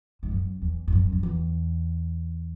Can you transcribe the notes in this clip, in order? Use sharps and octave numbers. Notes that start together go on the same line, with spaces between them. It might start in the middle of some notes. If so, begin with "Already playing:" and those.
G#2
F#2
E2
G#2
F#2
F#2
E2